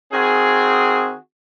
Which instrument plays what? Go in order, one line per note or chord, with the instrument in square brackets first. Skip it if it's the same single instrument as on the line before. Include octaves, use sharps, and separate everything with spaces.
[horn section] D#3 C4 F#4 G#4